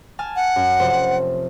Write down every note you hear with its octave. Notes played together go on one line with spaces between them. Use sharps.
G#5 A5 F6
F#5
F#2
F1 C5